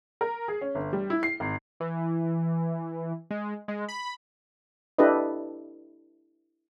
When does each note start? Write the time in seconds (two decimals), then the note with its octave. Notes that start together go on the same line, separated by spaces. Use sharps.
0.21 A#4
0.48 G#4
0.61 C#4
0.75 G1
0.93 G3
1.10 E4
1.23 C7
1.40 G#1
1.80 E3
3.31 G#3
3.68 G#3
3.88 B5
4.98 D4 E4 G4 A4 B4 D#5